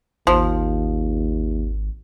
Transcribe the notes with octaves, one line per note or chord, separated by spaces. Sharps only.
G#1 D#2 F3